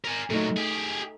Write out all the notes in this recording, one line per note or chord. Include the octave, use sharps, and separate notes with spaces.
A#4 G#5
A#2 F#3 A3 D#4
G4 G#4